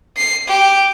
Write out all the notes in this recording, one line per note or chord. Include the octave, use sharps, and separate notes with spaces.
C7
G4